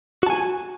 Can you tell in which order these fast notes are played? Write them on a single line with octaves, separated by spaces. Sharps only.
F#4 A5 G#5